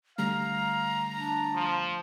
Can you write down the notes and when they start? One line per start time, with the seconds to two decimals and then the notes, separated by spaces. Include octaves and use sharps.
0.18 D3 G3 A3 F5 A#5
1.17 D4
1.55 F3